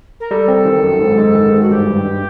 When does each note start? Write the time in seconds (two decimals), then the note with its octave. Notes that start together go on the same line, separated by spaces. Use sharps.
0.20 A#4
0.31 G3 A4
0.48 C4
0.65 D#3
0.83 F#2
1.01 G#2
1.18 G#3
1.35 D#3
1.52 G#2
1.61 F#4
1.70 G2 G4
1.86 G2
2.04 G2